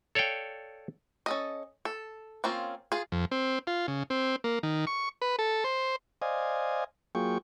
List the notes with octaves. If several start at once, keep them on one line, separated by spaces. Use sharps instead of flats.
A4 C#5 D5 F5 G5
C#4 A4 D#5
A4
A#3 C4 C#4 F4
F4 G#4
F2
C4
F4
C#3
C4
A#3
D#3
C#6
B4
A4
C5
C5 D5 D#5 F5 G#5
F#3 A#3 F4 G#4 G5 C#6